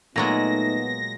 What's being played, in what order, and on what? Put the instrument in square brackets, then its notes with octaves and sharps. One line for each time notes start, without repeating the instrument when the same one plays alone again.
[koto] A#2 F#3 G#3 [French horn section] A3 D#4 [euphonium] B3 [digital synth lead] A#6